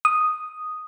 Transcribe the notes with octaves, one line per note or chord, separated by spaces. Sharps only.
D#6